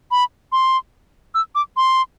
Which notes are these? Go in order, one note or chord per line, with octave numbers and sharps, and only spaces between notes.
B5
C6
E6
D6
C6